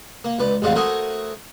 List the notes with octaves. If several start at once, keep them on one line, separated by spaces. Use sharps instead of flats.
A#3
C#2 B4 D5
A1 F2 G#3 F#4 D5 F5
A3 F#4 A#4 C5 G#5 D#6